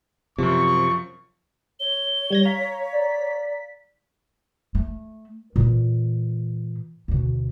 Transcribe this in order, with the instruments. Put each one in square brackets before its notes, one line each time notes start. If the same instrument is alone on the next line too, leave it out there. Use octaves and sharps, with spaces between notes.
[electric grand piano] F#2 F3 [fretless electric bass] C3 [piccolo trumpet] C#6
[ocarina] C#5 [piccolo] G7
[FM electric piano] G3 G#6 A#6
[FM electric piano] F5 A#5 [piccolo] B6
[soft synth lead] D5
[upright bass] A3
A#2 E3
D2 B2